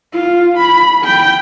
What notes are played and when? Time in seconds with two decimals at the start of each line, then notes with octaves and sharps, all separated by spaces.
0.13 F4
0.57 B5
1.04 G5